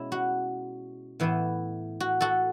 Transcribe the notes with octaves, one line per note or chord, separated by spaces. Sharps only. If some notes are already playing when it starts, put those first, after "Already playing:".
Already playing: B2 G#3 C#4 E4
F#4
A2 E3 B3 E4
F#4
F#4 A4